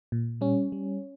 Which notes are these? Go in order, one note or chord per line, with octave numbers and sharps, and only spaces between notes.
A#2
G3 C#4
G3